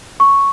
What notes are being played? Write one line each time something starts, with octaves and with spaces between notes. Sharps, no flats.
C#6